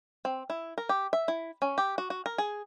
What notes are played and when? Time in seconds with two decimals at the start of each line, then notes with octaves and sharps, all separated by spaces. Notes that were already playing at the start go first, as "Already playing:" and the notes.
0.25 C4
0.50 E4
0.78 A#4
0.89 G4
1.13 E5
1.28 E4
1.62 C#4
1.78 G4
1.98 F#4
2.10 F#4
2.26 A#4
2.38 G#4